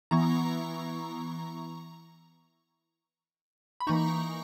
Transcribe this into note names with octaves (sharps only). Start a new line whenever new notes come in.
E3 B3 E4 A#5 C#6
B5
E3 A#3 D#4 A#5 C#6